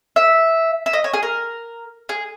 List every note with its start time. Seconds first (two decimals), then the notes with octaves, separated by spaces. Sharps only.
0.16 E5
0.86 E5
0.93 D#5
1.04 C#5
1.14 G#4
1.23 A#4
2.09 G#4